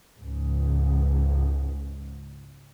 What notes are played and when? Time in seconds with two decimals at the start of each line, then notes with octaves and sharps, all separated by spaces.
0.16 C#2 G#2